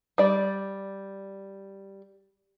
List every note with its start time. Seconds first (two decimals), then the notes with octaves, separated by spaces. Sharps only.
0.18 G3 D5